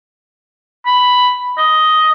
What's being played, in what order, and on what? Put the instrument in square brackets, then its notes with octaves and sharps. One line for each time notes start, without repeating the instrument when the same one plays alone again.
[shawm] B5
D#5